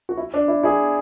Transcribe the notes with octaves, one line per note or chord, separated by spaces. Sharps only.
F#4
E4
D4
E4
E4 G#4